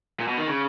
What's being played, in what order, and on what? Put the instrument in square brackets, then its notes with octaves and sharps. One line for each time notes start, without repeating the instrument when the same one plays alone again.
[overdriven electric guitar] A#2
B2
D#3
C#3